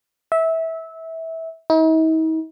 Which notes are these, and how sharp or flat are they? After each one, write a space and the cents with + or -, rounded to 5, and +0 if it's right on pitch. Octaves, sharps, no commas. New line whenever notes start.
E5 -20
D#4 +45